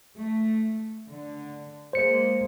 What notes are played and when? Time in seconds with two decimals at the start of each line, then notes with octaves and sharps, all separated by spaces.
0.17 A3
1.06 D3
1.93 G#3 A#3 C5 C#7